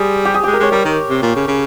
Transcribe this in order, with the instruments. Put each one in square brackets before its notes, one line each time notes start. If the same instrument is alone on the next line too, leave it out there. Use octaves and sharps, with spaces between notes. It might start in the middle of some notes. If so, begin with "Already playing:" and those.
Already playing: [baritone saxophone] G3 [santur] G#4 C5
[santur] G4
G#4
[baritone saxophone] G#3 [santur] G4
[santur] A#4
[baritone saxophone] G#3 [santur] C#5
[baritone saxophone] G3 [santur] A#4
[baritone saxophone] D#3
C3
A#2
C#3
C#3